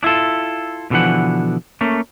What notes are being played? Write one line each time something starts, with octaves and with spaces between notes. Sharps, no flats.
D4 E4 F4 A4
G#2 B2 D3 E3 F3 F#5
A3 A#3 C#4